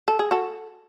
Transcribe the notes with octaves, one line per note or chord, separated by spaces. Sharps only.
A4
G#4
F#4 A4